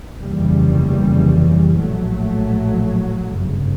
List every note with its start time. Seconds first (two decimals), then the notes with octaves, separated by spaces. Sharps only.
0.20 F1 D#2 C#3 E3 G3
1.75 A#1 A2 F#3 A3
3.32 G1 F#2 C#3